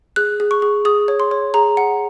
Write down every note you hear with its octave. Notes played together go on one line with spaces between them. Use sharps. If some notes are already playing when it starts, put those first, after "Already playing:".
G#4 F#6
G#4
C#6
G#4
G#4 D#6
C#5
C6
C#5
G#4 A#5
F#5